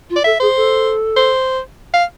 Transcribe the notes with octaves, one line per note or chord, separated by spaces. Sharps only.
F4
D5
A4 E5
G#4 C5
A4
C5
F5